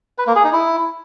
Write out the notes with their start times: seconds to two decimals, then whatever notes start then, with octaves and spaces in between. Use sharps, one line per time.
0.18 B4
0.27 A#3
0.36 G#4
0.44 D#4
0.53 E4